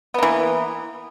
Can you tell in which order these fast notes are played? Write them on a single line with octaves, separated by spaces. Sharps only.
B3 A#3 E3